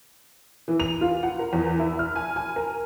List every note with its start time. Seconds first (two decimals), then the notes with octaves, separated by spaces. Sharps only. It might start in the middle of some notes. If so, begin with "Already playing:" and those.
0.68 E3
0.80 F7
1.01 F4
1.23 F#5
1.39 A#4
1.53 E2
1.79 E4
1.99 F6
2.16 G#5
2.36 G#5
2.56 A#4